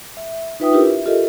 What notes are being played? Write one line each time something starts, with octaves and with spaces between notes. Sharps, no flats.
E5
D#4 F4 B4 E5 G5 D#6
D4 E4 F4 G4 A#4 B4
E5
F4 G4 A4 A#4 D#5 E5